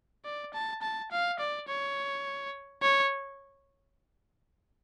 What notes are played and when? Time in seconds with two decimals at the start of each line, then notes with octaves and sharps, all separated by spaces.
0.25 D5
0.54 A5
0.82 A5
1.11 F5
1.39 D5
1.68 C#5
2.82 C#5